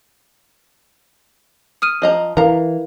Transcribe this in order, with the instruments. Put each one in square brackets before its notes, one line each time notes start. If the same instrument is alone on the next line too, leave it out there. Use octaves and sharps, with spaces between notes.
[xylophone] D#6 F6 D#7
[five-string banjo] F3 D#5 A#5
[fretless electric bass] E3 [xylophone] A#4 F5 [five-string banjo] A#5